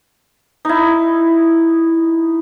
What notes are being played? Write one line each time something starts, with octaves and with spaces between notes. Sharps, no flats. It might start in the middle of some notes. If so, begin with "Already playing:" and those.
D#4 E4